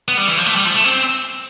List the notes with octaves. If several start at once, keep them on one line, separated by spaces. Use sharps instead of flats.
B3
G3
E3
F3
A3
G3
F3
A3
C4